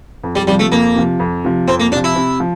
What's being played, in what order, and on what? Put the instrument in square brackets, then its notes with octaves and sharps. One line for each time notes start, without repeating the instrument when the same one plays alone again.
[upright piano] F2
[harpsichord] G3
[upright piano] C3 F3 [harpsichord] G3
[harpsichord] A3
[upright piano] F2 [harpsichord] A#3
[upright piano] C3 F3
F2
C3 F3
[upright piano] F2 [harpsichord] C4
[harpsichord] A#3
[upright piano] C3 F3 [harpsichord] D4
[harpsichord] E4
[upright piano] C3
F3